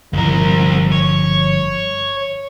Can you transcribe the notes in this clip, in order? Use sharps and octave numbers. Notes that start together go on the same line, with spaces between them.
G1 C2 F3 A#4
C#5